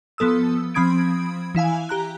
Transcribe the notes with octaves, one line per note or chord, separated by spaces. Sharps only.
F3 B3 A4 D#6 E6
F3 C4 B5 D#6 G#6 D7
E3 E4 F5 G#5
G4 A#5 F#6